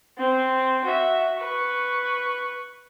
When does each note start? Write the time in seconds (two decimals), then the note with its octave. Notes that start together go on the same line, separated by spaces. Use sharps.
0.18 C4
0.85 F#4 E5
1.39 B4 C#6